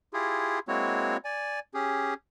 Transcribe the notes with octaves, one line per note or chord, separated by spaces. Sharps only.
E4 F4 G4 G#4
G#3 A#3 C4 E4 F#4 C#5
D5 G#5
C#4 G4 G#4